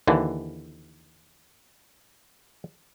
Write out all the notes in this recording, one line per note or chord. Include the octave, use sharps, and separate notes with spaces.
D#2 D3 E3